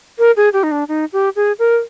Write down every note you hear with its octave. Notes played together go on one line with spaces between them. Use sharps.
A#4
G#4
G4
D#4
D4
D#4
G4
G#4
A#4